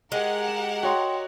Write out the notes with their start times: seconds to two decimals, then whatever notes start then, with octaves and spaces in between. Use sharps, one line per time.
0.12 G#3 G4 A#4 F#5
0.48 E7
0.83 F#4 C#5 D#5 G5 C6